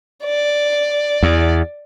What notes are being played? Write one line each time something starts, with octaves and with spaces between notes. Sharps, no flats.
D5
E2